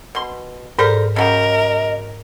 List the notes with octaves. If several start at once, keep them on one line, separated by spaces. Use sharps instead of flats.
B2 C6
G#2 G3 A4 A#4 C5
C#3 F#3 G4 A#4 D#5